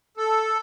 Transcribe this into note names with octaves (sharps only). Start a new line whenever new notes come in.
A4